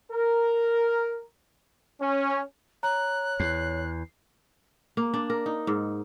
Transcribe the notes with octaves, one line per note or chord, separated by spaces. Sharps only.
A#4
C#4
C#5 A#5 F#6
E2 C7
A#3
D4
A#4
D#4
G#2